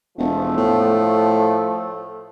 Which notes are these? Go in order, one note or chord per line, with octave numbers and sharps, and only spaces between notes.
E1 F3 A3
A2